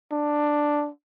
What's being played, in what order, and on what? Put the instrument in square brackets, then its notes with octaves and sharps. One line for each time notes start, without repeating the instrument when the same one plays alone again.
[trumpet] D4